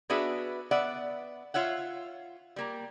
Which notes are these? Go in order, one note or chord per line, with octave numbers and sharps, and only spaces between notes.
B3 D4 F#4 G#4 B4 E5
B3 D5 E5 F#5
F4 C#5 E5 F#5
G3 A#3 A#5